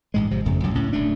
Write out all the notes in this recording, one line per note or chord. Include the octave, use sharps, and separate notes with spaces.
A1 G#2 G#3
G#1 C3 F3
G1 F2 C#3 A3
C2 F#2 A#2 F#3
C#2 A2 C#4
D1 D2 A3 D4